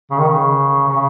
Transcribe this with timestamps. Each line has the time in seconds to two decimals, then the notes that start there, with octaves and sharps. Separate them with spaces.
0.11 C#3
0.19 D#3
0.29 C#3
0.88 C#3